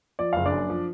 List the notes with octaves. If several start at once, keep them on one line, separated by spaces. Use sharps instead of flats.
F3 D5
F#1 F5
D4 D5
F#2
F3